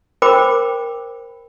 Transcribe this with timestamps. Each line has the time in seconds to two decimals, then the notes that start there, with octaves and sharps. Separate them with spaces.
0.22 A#4 C5 G5 B5 D6